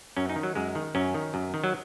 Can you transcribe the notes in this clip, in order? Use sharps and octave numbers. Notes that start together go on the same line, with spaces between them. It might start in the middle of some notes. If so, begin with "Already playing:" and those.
F#2 C#4
D#4
D#3
F#3
F#2 G#3
D#3
F#2 C#4
D#3
F#2
D#3
F#3